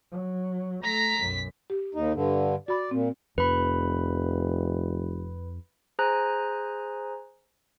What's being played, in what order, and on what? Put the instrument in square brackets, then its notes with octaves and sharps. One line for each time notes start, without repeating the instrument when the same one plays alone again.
[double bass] F#3
[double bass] A3 [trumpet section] A#5 [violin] B6
[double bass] B1 F#2
[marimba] G4
[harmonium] D#2 D#4
G2 D3
[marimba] F#4 B5 [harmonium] D5
[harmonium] A#2 [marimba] C4
[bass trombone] F1 [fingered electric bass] F2 [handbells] B4 B5
[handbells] G#4 C5 G#5 A#5 F#6